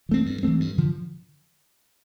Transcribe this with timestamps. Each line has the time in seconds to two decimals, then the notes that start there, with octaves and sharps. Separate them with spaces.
0.09 E3 A3 C4
0.26 G2
0.43 E3 A3 C4
0.60 G2
0.78 D3 F3